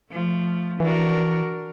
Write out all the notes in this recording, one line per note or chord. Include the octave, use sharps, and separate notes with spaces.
F3 A3
E3 D4 F#4 A#4